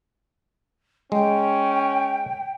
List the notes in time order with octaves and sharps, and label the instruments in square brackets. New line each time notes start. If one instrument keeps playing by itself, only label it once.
[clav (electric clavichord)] G#3 [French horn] C#4 [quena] G5